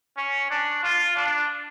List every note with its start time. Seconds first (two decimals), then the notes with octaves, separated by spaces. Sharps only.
0.18 C#4
0.51 D4
0.83 F4
1.16 D4